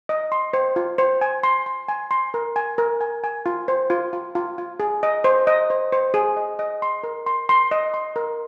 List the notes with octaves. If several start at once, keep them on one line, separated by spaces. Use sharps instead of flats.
D#5
C6
C5
F4
C5
G#5
C6
C6
G#5
C6
A#4
G#5
A#4
G#5
G#5
F4
C5
F4
F4
F4
F4
G#4
D#5
C5
D#5
C5
C5
G#4
D#5
D#5
C6
A#4
C6
C6
D#5
C6
A#4